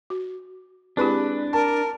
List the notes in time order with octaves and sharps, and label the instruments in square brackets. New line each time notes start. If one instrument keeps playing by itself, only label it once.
[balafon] F#4
[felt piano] G#3 B4 B5 [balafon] C4 E4 G4 [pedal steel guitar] D4
[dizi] A#4 [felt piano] A5